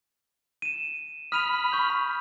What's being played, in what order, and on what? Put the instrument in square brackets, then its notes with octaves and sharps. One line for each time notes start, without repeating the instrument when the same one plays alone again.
[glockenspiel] D#7 E7
[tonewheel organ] B5 [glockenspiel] D#6 D#7 F7 [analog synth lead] F6
[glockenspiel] C#6 G6